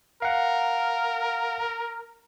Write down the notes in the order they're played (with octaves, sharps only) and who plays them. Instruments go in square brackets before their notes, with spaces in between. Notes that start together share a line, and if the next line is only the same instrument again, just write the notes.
[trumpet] A#4 [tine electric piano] F5 F#5